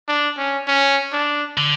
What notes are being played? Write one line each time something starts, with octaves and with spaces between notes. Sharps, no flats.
D4
C#4
C#4
D4
D3